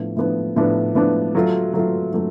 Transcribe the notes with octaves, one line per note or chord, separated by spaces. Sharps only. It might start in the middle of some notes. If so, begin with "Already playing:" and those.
Already playing: A2 F3 B3 D4
A2 F3 B3 D4
A2 F3 B3 D4
A2 F3 B3 D4
F#3 A3 F4
F#3 A3 F4
F#3 A3 F4